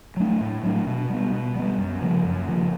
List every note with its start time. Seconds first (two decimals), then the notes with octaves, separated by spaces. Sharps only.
0.17 F#3 A3 D4
0.41 A2
0.63 F#3 A3 D4
0.87 B2
1.10 G3 B3
1.32 B2
1.55 G3 B3
1.78 F#2
2.01 C#3 F3 A#3
2.25 F#2
2.48 C#3 F3 A#3